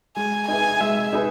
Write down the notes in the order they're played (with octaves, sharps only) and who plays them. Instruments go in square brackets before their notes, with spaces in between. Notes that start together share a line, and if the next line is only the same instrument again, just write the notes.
[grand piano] G#3 [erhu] G#5
[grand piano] D#4 G#4 B4 E5 [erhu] G#5
[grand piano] G#3 [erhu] E5
[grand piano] D#4 G#4 B4